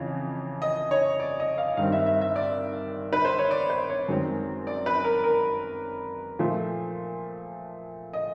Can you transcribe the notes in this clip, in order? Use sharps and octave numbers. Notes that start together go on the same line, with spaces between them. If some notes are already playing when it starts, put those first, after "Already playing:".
Already playing: F2 C#3 E3
D#5
C#5
D5
D#5
F5
G2 D#3 G3 C4 F5
E5
E5
E5
D5
B4
C5
C#5
D5
C5
C#5
F#2 D#3 G#3 C4
D5
B4
A#4
A#4
A#2 F3 A3 C5
D#5